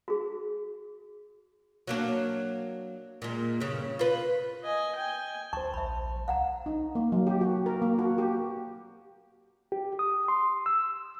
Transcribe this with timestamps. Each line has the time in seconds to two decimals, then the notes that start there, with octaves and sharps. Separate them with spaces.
0.08 F#4 G#4
1.87 F#3 A#3 D4
3.22 A#2 G#3
3.60 G2 C#3
3.99 F4 B4
4.64 D#5 G#5
4.96 G5 G#5
5.53 D2 C5 A5 C#6
5.74 A#1 E5 B5
6.28 C2 F5 F#5 A#5
6.66 D#4
6.95 A#3
7.12 F#3
7.27 G4
7.41 F#4
7.66 A#4
7.82 A#3
7.99 F#4
8.18 G4
9.72 G4
9.99 D#6
10.28 C6
10.66 E6